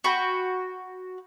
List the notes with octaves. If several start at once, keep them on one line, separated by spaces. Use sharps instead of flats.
F#4 G5 B5